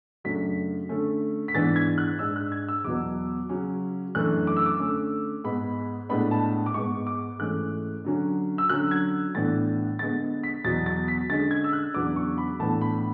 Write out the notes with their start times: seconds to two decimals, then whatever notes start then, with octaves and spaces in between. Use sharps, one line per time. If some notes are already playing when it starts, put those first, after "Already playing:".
0.24 F#2 C#3 F#3 A3 D4 B6
0.89 D3 A3 C#4
1.48 B6
1.54 G#2 E3 B3 D4 A6
1.76 G#6
1.98 F#6
2.19 G#2 G#3 D4 E6
2.36 F#6
2.52 G#6
2.69 E6
2.84 E2 B2 F#3 B3 D6
3.49 C#3 F#3 C#4
4.15 F#2 E3 A3 D4 F#6
4.47 D6
4.57 E6
4.66 D6
4.79 D3 A3 C#4 D6
5.44 G#2 G#3 B3 B5
6.09 A2 G#3 B3 D4 B5
6.31 A5
6.66 D6
6.74 G#2 G#3 B3 C#6
7.07 D6
7.39 G#2 E3 A3 C#4 F#6
8.04 D3 F#3 C#4
8.58 E6
8.69 D3 F#3 C#4 F#6
8.91 G#6
9.35 A2 E3 B3 D4 A6
9.99 D3 G#3 B3 A6
10.43 B6
10.64 E2 B2 F#3 A6
10.86 A6
11.08 B6
11.29 D3 G#3 C#4 A6
11.51 G#6
11.64 E6
11.73 F#6
11.94 E2 C#3 F#3 B3 D4 D6
12.16 C#6
12.38 B5
12.60 A2 E3 B3 D4 A5
12.81 B5